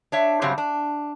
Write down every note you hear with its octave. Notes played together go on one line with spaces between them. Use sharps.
D4 C#5 E5
G2 C#3 F#3 G3 C4 C#5
D4